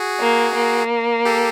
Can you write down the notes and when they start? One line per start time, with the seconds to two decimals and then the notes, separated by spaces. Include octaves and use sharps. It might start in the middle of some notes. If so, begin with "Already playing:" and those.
Already playing: F#4 G#4
0.20 A#3
0.55 A#3
1.25 G4 A4